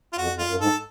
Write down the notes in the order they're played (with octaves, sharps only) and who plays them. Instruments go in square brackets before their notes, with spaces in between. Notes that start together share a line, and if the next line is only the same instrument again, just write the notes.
[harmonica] F4
[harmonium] F2 [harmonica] F#4
[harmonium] F2
[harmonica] F4
[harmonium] F#2
[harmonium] G#2 [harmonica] A4